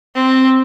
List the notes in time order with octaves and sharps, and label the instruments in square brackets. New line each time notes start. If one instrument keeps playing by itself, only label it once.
[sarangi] C4